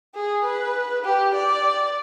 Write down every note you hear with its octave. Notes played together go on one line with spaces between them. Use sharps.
G#4
B4
G4
D5